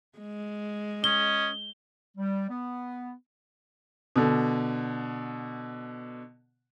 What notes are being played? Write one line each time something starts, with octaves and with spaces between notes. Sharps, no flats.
G#3
C#4 D#5 G7
G3
B3
B2 D3